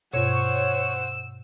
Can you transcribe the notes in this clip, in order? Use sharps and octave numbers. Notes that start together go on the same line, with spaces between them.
G2 B2 C5 C#5 F#5 E6